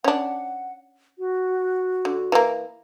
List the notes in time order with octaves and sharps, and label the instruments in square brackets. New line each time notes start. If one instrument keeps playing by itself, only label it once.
[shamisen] C#4 D4 [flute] F#5
[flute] F#4
[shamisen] D3
E3 A#3